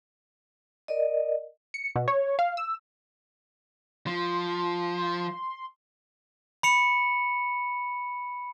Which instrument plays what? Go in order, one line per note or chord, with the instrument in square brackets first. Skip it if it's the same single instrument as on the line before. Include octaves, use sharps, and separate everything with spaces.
[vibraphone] A#4 D5 D#5
[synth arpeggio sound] C#7
B2
C#5
F5
E6
[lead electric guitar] F3 [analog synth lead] C6
[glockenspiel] B5 C#7 F7